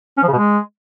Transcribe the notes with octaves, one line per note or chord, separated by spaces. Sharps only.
C#4
F3
C#3
B2
G#3